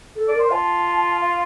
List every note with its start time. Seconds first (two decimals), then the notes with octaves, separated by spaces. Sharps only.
0.16 A4
0.28 D5
0.34 A#4
0.39 C5
0.51 F4 A5
1.21 F5